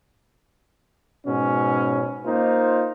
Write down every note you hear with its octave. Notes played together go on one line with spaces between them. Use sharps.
G#2 B2 C#4
A#3 D#4 F4 C5